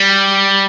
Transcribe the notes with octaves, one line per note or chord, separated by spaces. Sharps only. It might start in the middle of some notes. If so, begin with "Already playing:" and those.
Already playing: G3